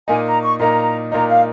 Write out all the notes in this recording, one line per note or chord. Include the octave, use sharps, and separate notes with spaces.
A#2 A#3 D#4 G#5
A#5
C#6
A#2 A#3 D#4 A#5
A#2 A#3 D#4 A#5
F5